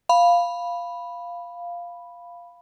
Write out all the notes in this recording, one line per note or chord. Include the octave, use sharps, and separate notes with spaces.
F5 B5